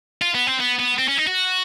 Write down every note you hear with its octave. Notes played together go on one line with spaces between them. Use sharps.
F4
B3
C4
B3
B3
C4
C#4
D#4
F#4